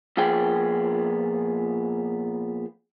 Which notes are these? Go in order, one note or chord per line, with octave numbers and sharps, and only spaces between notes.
A#2 F3 B3 G#4 G5